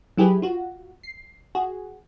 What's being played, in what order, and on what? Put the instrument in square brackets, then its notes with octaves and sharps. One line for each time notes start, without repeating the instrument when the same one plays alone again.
[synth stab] F#3 E4 G4 G#4 B4
F4 F#4
C7
F#4 G#4